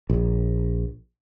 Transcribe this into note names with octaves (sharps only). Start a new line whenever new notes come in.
A#1